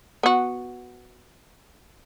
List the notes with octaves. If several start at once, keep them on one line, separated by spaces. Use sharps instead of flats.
B3 F#4